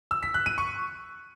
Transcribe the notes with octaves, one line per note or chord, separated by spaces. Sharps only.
E6
B6
F#6
D#7
C#6